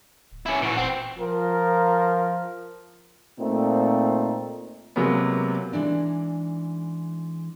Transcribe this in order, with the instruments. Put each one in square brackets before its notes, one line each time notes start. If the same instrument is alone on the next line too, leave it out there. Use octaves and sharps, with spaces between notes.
[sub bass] D1
[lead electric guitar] C#4 E4
[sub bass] A#2 [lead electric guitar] E3 F#4
[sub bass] E1 [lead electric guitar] C4
[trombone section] F3 A#4
A#2 A3 C4 D#4
[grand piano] C3 F#3 G#3 A#3 B3
[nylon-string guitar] E3 G#3 D4 D#4